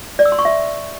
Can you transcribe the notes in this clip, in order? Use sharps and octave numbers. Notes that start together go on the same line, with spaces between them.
D5
E6
C6
C#6
E5